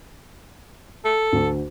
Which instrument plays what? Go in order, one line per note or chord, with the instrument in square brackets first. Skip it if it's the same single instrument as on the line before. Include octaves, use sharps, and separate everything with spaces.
[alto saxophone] A4
[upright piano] D2 D3